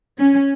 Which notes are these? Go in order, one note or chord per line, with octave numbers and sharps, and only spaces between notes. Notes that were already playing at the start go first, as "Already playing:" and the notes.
C#4